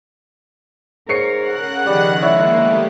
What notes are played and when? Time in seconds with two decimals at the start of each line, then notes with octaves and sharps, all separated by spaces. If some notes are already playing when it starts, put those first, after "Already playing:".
1.09 G#2 A#4 C#5 C7 C#7
1.40 C#3 F#5 F#6
1.86 D#3 F3 G3
2.22 G#3 A#3 E4 C#5 D5
2.58 A3 B3 G4